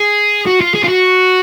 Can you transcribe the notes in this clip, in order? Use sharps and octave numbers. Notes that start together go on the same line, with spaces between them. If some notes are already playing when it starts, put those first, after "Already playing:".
Already playing: G#4
F#4
F4
G#4
F4
F#4